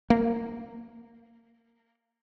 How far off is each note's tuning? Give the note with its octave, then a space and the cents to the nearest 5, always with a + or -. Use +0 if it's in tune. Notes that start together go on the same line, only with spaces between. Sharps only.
A#3 -15